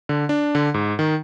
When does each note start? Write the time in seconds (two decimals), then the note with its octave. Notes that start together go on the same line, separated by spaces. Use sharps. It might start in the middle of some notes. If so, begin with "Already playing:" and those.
0.09 D3
0.29 D4
0.55 D3
0.74 G#2
0.99 D#3